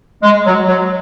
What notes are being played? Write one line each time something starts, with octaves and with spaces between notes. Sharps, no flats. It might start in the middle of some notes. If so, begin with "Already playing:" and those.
G#3
F#3
F#3